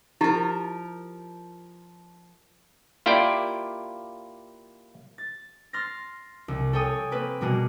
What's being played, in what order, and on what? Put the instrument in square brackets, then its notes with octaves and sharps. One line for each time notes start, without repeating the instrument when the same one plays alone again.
[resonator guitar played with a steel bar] F3 A#4 [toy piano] E4 G4
[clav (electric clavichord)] A#3 E4 F4 G4 D5 G5
[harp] A6
C6 F6 A6 A#6
C2
A4 C#5 G5 G#5 D#6
A#3 C4 B4
B2 G3 A#3 F#4 G#4